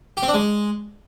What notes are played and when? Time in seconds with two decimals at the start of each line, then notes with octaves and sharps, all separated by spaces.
0.17 G4
0.23 C4
0.28 D4
0.34 G#3